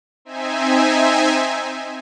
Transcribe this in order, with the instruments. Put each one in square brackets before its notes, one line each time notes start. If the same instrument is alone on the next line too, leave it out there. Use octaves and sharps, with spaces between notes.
[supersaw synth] C4 D#4 E5 G#5